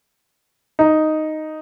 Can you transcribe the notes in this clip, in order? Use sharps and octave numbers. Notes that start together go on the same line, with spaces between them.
D#4